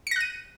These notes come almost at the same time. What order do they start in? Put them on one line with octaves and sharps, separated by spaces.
C#7 A#6 F#6 D#7